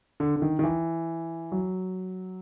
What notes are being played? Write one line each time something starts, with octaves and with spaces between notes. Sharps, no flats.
D3
D3
D#3
D#3
E3
F#3